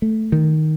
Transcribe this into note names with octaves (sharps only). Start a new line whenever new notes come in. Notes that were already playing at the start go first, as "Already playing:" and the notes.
A3
D#3